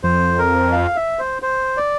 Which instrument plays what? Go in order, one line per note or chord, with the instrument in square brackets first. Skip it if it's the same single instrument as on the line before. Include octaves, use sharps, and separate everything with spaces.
[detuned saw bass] F2 [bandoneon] C5
[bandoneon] A#4
F5
E5
C5
C5
D5